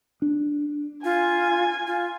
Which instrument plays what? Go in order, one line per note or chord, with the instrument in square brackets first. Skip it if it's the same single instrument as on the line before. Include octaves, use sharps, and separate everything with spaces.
[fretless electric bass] D4
[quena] F4 [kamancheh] G#5
[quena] F4